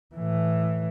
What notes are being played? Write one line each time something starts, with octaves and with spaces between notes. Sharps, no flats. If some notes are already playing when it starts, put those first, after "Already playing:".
A2 E3